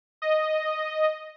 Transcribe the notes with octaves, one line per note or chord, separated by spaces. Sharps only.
D#5